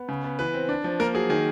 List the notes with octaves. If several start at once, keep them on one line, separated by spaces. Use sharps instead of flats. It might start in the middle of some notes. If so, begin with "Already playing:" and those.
Already playing: B3
C#3
B3
E3 B4
C4
D4
F3
A#3 A#4
F#3 G#4
D#3 G#4